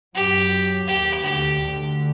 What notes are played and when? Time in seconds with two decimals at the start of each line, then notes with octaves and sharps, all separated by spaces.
0.15 F#2 F#3 G4
0.87 D#2 D#3 G4
1.23 D2 D3 G4
1.59 D2 D3